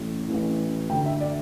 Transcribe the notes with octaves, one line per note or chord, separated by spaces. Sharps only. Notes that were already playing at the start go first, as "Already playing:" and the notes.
Already playing: A1 A2
A1 A2 E3
D2 D3 G5
E5
D5